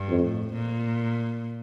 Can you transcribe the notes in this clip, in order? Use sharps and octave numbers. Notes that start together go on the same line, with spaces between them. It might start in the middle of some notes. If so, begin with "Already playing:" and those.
Already playing: G2
F2
A2
A#2